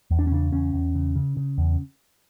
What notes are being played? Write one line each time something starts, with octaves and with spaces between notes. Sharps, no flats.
E2
D4
C#4
C#3 D4
E2 C#4
E2
C#3
C#3
C#3
E2